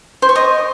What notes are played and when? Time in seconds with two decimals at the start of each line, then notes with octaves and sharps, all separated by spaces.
0.22 C5
0.29 C#6
0.36 D#5